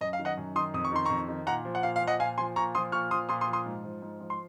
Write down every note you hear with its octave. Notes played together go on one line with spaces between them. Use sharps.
F#2 D#5
F5
D#3
D#5 F#5
F#2
D#3 C6 D#6
F2 D#6
C#6
D#3 C6
F2 A#5 C#6
D#3
A#2 F#5 A#5
F3
F#5
A#2 F5
F5
F3
D#5 F#5
A#2 F5 G#5
F3 G#5 C6
A#2 A#5 C#6
F3 C6 D#6
A#2 C#6 F6
F3 C6 D#6
A#2 C6 D#6
C6 D#6
F3
C6 D#6
G#2
F3
G#2
F3
C6